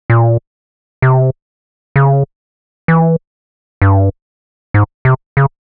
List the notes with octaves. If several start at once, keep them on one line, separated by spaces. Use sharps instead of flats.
A#2
C3
C#3
E3
G2
G#2
C3
C#3